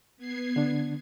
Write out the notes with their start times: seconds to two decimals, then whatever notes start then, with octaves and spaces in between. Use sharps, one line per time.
0.17 B3 G#6 C7
0.56 D3 D4